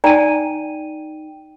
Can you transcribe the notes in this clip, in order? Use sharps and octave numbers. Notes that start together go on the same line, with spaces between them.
D#4 D5 G5 G#5 A#5 D#7